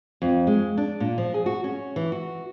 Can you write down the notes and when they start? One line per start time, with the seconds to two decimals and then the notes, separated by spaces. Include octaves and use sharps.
0.22 F2
0.47 G#3
0.78 D4
1.00 A#2
1.18 F3
1.34 G#4
1.46 F#4
1.64 C#4
1.96 E3
2.12 F#4